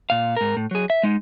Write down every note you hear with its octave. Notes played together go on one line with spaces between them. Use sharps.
A#2 F5
G#2 A#4
A2
F#3 G#4
E5
G#3 D#4